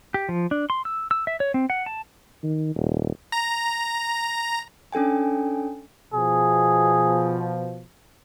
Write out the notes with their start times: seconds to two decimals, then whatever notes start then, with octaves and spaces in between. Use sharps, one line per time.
0.14 G4
0.29 F3
0.51 D4
0.70 C6
0.85 E6
1.11 E6
1.27 E5
1.40 C#5
1.54 C4
1.70 F#5
1.86 A5
2.43 D#3
2.75 D#1
3.32 A#5
4.93 C#4 D4 A4 G5 G#5
6.14 B2 F3 G#4